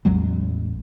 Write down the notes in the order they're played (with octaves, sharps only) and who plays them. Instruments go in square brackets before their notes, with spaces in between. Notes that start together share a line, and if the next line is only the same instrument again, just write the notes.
[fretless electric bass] A1 E2 F#3 G#3